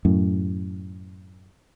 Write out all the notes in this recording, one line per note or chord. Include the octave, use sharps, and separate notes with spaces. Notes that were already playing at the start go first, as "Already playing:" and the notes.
F#2 A2